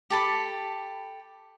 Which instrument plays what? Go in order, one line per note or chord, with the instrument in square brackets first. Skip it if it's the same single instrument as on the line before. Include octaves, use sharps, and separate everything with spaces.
[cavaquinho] G4 A4 B5